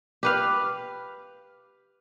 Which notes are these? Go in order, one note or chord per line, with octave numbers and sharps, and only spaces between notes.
G4 B4 F5